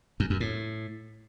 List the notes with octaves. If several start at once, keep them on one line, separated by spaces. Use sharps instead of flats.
F#2
F#2
A2